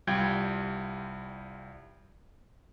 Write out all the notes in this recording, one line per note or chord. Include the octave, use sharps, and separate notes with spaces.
C2 G3 F4 G5 G6 G#6